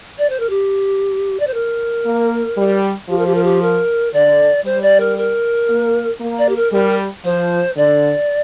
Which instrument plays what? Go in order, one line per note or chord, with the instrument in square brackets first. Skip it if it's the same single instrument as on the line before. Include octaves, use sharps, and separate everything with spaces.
[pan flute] D5
C5
A#4
G4
D5
C5
A#4
[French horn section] A#3
G3
[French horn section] F3 [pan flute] G4
[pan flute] A#4
G4
A#4
G4
A#4
[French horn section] D3 [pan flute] D5
[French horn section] G3 [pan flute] C5
[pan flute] D5
A#4
A#4
[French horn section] A#3
A#3
[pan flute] D5
G4
A#4
[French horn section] G3 [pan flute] A#4
[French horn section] F3 [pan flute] C5
[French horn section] D3 [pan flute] D5